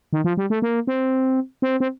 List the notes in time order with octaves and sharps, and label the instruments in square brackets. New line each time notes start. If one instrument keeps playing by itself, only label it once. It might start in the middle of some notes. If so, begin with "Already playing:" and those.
[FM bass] D#3
F3
G3
A3
A#3
C4
C4
C4